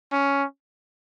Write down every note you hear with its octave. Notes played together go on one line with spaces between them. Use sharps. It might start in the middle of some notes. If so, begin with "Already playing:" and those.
C#4